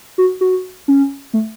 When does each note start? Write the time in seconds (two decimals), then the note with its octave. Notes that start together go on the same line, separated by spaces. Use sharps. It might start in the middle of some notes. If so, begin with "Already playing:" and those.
0.18 F#4
0.41 F#4
0.88 C#4
1.33 A3